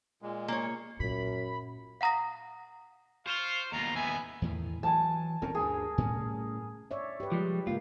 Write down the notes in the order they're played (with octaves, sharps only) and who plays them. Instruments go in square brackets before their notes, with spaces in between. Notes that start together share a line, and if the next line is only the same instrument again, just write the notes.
[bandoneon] A#2 G#3
[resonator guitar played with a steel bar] A#3 C#5
[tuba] F#2 [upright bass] A#2 [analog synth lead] B5
[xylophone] F5 F#5 A#5 D#6 A#6
[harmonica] F4 F5 C#6 [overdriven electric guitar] C5 C6
[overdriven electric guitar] D#2 B2 [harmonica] F4 A#5
[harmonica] B3 E5 G#5
[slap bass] E2 A2 D#3
[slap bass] E3 F#3 [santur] G#5 A5
[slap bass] D#1 C4 C#4 [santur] A#4
[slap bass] D2 G2 [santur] G#4
[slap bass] A2 G3 C#4
[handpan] C#5 D5 E5
G4 B4
[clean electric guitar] F3 G3 G#3
[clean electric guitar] C#2 F4 [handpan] G#3 A#3